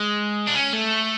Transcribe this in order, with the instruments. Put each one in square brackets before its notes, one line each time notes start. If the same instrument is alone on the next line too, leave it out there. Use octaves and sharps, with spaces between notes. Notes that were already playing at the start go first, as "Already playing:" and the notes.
Already playing: [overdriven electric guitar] G#3
D4
C#4
A3